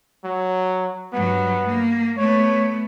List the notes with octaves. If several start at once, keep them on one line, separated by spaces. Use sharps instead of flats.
F#3
G2 F#3 B3
A#3
A3 B3 C#5